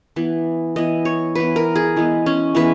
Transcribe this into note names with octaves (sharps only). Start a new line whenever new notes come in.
E3 B3
E3 B3 D#5
C#5
E3 B3 B4
A#4
G#4
E3 G#3 B3
C#4
E3 G#3 B3 B4